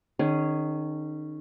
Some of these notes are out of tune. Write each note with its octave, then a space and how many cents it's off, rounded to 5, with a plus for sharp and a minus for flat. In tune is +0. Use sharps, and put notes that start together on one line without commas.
D#3 -25 C#4 -5 G#4 +0